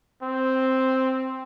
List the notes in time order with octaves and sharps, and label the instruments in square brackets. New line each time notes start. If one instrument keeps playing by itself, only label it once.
[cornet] C4